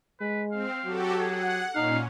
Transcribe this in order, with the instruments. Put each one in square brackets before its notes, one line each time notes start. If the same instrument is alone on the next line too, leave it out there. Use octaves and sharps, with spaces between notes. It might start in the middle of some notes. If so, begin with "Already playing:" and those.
[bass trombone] G#3 [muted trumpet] B4
[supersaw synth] C4 [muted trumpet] F5
[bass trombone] F#3 [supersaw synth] F#4 G4 A4
[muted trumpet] G#4 [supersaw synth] F#5
[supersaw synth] A#2 C#4 [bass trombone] D#4 [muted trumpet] F5